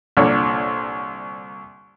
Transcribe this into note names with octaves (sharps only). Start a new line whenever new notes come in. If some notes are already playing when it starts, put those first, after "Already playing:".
C2 A#2 D3 C#5